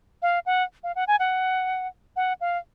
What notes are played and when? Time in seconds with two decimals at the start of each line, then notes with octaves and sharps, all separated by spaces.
0.22 F5
0.46 F#5
0.83 F5
0.96 F#5
1.07 G#5
1.19 F#5
2.16 F#5
2.41 F5